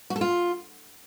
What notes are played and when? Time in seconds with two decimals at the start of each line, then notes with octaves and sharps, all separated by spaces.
0.10 F#4
0.16 A4
0.21 F4